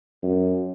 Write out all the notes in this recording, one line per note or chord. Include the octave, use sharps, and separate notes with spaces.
F#2